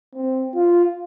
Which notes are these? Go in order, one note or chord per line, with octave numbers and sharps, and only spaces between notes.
C4
F4